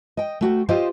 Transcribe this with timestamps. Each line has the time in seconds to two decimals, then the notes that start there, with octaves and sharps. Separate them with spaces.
0.17 D#5 G5
0.41 A3 F#4 G5
0.69 F4 G4 C5 D#5 F5 G5